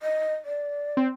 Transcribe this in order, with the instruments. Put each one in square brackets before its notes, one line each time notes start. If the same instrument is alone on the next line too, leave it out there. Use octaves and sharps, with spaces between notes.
[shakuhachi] D#5
D5
[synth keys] C4